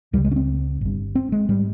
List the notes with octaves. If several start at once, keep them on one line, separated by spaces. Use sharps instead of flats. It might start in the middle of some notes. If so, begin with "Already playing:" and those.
C#2 C#3 G3
G#3
C#4
C4
G1 G2
C4
G#3
G#2 G3